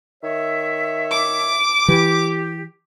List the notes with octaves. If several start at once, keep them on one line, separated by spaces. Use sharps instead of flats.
D#3 C#5 E5
D6
E3 G4